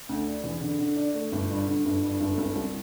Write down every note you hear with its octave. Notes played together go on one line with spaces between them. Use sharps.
D2
D4
E2
D3
D3
D4
A3
G1
G2
D3
G1
G2
G1
C2
C2